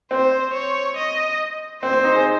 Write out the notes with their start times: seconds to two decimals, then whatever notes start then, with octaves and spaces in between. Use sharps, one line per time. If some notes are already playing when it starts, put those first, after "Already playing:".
0.11 C4 C5
0.54 C#5
0.96 D#5
1.83 C4 C5
1.93 C4
2.04 D#4
2.15 G#4